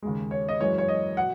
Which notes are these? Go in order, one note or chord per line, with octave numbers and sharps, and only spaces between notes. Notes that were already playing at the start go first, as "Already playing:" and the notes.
D#2 C#3 G#3
C#5
D#5
F#2 E3 G#3 C#5
C#5
D#5
B2 F#5